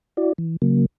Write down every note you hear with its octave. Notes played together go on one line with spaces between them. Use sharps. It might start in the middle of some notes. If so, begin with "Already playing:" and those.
E4 F#4 D5
E3
C#3 F#3 A#3